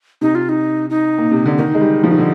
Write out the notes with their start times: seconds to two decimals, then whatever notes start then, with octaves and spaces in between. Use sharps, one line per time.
0.21 C3 D#4
0.35 F4
0.49 D#4
0.90 D#4
1.18 A#2
1.32 C3
1.46 D3
1.58 D#3 D#4
1.75 G#3
1.81 G3
2.04 F3
2.10 D#3
2.18 D3